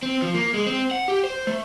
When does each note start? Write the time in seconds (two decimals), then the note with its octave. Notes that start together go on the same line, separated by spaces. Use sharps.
0.03 C4
0.22 F3
0.35 A#3
0.54 G#3
0.67 C4
0.91 F#5
1.08 G4
1.24 C5
1.47 A3